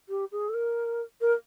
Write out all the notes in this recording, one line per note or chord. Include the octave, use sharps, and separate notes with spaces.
G4
G#4
A4
A#4
A#4